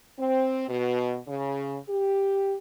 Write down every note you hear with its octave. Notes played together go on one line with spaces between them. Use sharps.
C4
B2
C#3
G4